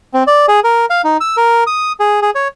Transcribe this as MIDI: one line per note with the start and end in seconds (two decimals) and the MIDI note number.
0.14 0.23 60
0.27 0.46 74
0.48 0.60 68
0.64 0.86 70
0.90 1.02 77
1.04 1.17 63
1.21 1.36 88
1.37 1.64 70
1.67 1.92 87
2.00 2.20 68
2.22 2.30 68
2.35 2.48 73